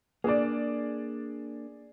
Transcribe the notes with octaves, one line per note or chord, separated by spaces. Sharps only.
A#3 D4 G#4 D5